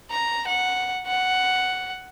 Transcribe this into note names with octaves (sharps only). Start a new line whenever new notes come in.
A#5
F#5
F#5